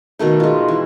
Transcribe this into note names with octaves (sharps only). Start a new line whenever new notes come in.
B2 D#3 A3 D#4
G#3 F4
E3